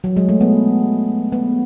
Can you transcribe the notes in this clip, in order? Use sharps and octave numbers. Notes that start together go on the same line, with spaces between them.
F#3
G#3
A3
B3
B3